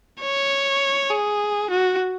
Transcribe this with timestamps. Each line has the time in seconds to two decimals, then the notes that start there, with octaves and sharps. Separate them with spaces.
0.22 C#5
1.11 G#4
1.70 F#4